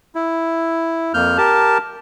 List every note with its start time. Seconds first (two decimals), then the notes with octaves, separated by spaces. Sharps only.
0.15 E4
1.14 F2 A#3 F6 G6
1.38 G4 A#4 A5